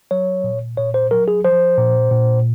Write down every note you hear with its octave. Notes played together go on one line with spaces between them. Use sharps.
F#3 C#5
A#2
A#2 C#5
C5
F#3 A#4
G#4
F3 C5
A#2
A#2